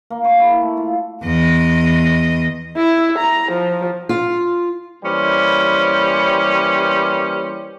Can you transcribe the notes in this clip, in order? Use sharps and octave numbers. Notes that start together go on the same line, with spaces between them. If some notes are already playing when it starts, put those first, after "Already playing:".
A#3
C#6
E4
A3
F4
E2 D#5
E4
A#5
F3
F4
E3 G3 A#3 C#4 G4 C5